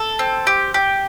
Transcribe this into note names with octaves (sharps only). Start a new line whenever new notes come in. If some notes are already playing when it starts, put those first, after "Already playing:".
Already playing: A4
C4
G4
G4